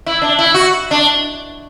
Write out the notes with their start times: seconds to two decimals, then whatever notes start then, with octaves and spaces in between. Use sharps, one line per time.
0.06 E4
0.22 D4
0.39 E4
0.54 F#4
0.91 D4